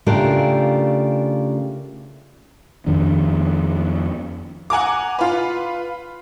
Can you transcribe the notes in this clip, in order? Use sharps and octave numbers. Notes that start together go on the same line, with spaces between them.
C#3 A3 D4 F4 G4 A#4
F2 D#3 D4
F#5 G#5 A#5 D6
F4 B4